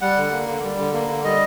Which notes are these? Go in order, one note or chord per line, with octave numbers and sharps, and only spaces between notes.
G3 F#5
D3
A#3
D3
G3
D3
A#3
D3
G3 D#5